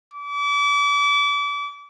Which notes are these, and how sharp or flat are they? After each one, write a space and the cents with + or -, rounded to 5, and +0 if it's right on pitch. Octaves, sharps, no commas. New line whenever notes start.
D6 -35